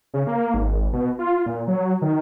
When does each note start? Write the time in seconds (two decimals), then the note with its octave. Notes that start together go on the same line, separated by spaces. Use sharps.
0.14 C#3
0.27 A#3
0.54 G#1
0.93 B2
1.19 F4
1.46 A#2
1.67 F#3
2.02 D#3